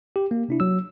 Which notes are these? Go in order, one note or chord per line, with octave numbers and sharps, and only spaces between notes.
G4
A#3
C3 D4 E4
F#3 E6